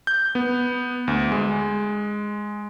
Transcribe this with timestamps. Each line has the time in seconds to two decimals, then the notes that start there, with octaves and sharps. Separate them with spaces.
0.07 G6
0.35 B3
1.08 D2
1.32 G#3